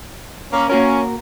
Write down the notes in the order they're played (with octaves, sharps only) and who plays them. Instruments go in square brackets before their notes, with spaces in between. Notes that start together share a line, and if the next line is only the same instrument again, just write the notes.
[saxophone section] A#3 C#4
[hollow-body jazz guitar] A#3 F#4 A#4 [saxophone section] C#4